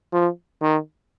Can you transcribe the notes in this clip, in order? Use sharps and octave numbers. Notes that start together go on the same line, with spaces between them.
F3
D#3